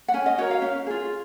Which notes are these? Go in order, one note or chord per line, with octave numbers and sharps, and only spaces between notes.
F#5
C#4 G#5
D#5
F#4 A#4 C#5
F5
C#4
F4 G#4